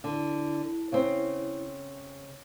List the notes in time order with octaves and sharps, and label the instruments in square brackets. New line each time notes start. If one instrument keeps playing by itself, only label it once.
[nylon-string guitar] D3 [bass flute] E4
[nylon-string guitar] C#3 C4